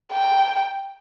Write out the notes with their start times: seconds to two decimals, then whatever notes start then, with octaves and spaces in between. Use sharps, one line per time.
0.12 G5